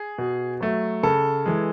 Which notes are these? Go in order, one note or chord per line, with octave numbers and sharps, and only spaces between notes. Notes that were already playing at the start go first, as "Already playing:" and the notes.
Already playing: G#4
B2
F#3 A3
C#3 A4
E3 G#3